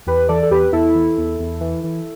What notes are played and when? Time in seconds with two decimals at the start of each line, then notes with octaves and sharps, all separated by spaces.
0.07 E2 G4 B4
0.29 E3 A4 D5
0.43 A4
0.51 E2 G4 B4
0.72 E2 E4 A4
0.95 E3
1.18 E2
1.39 E2
1.61 E3
1.84 E3